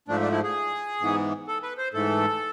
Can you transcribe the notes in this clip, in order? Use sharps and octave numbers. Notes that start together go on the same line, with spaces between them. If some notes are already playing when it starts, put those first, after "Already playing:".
G#2 F3 A3 D4
D4
E4
G#4
G#2 E3 B3
A4
B4
C5
G#2 E3 A3 A4